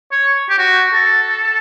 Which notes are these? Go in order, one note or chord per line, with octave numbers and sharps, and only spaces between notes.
C#5
G4
F#4
A4